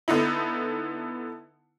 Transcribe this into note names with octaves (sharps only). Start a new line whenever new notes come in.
D3 B3 D#4 E4